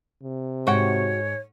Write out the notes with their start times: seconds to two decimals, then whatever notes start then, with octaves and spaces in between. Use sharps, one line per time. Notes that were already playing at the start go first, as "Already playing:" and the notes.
0.23 C3
0.67 G#2 F#4 C#5 F#5 G5